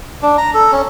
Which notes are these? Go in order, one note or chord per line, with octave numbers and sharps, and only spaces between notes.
D4
A#5
A4
C#4